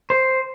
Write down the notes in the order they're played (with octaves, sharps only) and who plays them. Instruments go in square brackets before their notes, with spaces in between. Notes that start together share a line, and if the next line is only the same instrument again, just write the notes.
[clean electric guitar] C5